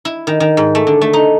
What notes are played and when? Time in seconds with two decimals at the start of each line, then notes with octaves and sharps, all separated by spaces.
0.05 E4
0.27 D#3
0.40 D#3
0.57 G#2
0.75 A3
0.87 D3
1.01 A3
1.13 D#4